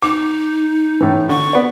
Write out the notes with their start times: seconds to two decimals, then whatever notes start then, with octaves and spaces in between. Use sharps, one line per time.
0.02 D#4 D6
1.01 A2 E3
1.29 D3 C#6
1.53 B3 D5